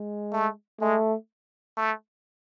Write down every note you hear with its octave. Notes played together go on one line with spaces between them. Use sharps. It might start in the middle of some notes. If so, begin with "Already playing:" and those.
Already playing: G#3
A3
G#3 A3
A3